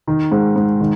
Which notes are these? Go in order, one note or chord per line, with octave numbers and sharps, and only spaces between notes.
D#3
G#2
G#2
D#3